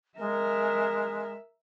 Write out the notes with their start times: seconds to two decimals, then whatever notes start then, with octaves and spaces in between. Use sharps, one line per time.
0.18 G#3 A#4 E5